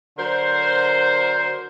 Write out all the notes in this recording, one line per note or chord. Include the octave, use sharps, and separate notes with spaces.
D3 F#3 A#4 C5